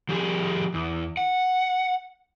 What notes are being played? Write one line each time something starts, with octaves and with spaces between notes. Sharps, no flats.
F3 G4 G#4
E2
F#5